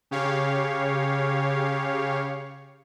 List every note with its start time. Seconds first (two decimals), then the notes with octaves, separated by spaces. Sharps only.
0.11 C#3 G4 C#5 F5